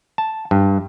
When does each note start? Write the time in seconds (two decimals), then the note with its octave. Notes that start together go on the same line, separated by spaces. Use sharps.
0.18 A5
0.51 G2